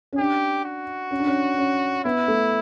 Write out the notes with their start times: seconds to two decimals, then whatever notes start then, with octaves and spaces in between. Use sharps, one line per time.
0.13 C#4
0.18 D4 G4
0.65 F#4
1.11 C#4
1.19 D4
1.27 C#4
1.58 C#4
2.05 B3 E4
2.28 A3